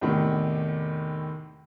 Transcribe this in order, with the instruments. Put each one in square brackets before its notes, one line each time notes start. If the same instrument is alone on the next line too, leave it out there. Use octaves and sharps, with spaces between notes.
[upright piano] E2 A2 C3 D#3